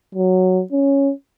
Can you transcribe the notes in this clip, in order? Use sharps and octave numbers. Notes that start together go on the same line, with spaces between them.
F#3
C#4